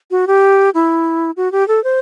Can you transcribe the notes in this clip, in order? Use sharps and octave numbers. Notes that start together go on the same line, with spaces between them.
F#4
G4
E4
F#4
G4
A4
C5